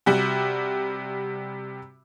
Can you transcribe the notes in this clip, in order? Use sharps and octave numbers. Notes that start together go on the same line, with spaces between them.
C3 G3 F#4